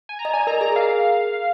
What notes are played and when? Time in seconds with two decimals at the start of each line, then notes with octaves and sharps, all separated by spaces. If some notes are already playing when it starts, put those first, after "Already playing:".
0.09 G#5
0.19 A#5
0.25 D#5
0.33 D5 G#5
0.47 A#4 A#5
0.61 G#4 A#5
0.76 A#4 F5